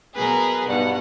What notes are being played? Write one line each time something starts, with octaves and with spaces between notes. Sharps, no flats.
B2 F#3 G#4 A#4 B4
G2 B2 D#4 F#5